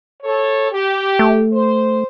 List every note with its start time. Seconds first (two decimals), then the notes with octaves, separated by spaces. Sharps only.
0.22 A4 C#5
0.72 G4
1.19 A3
1.53 C5